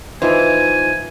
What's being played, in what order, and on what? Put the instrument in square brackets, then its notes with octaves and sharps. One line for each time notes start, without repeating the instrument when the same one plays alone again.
[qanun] E3 [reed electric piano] D#4 F4 C5 [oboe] G#5